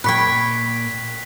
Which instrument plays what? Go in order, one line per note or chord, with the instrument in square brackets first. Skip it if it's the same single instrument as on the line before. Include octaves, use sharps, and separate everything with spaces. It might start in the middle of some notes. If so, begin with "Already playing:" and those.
[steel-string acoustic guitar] A#2 G5 [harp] B5 C#6 G#6 [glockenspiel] F#6 B6